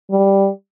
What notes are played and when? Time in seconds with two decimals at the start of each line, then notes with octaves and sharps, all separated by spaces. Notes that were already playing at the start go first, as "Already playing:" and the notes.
0.11 G3